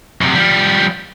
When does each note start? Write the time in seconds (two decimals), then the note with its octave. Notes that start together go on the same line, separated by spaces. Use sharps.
0.21 F#2 C3
0.35 F3 G3